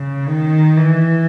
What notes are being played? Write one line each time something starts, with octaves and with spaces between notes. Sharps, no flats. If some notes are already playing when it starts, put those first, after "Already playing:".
Already playing: C#3
D#3
E3